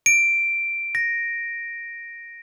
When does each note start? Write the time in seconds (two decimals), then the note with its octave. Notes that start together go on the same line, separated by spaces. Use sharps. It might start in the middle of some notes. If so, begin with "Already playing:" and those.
0.06 D7
0.95 A#6